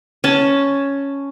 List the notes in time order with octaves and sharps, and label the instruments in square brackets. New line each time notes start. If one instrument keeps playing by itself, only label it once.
[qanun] C#4 A5